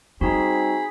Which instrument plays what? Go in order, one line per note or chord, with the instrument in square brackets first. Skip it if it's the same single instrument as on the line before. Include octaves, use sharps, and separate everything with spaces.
[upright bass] G3 [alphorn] C4 [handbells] D#4 F#4 [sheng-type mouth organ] G#4 B5